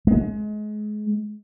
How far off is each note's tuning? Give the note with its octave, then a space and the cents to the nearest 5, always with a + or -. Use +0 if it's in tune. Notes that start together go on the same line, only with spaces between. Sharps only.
G#3 +30